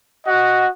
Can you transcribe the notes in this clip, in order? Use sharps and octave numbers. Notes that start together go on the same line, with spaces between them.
F#4 D#5 F#5